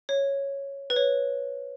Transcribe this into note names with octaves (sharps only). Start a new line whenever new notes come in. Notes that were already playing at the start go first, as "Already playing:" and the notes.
C#5
B4
C#5